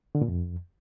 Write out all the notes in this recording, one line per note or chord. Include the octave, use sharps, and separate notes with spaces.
D3
A#2
F2